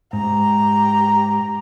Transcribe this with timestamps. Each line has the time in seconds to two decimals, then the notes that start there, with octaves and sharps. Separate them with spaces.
0.13 G#2 G4 A#5